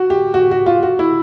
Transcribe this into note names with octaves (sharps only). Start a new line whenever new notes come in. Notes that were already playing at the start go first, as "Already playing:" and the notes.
Already playing: F#4
G4
F#4
F#4
F4
F#4
E4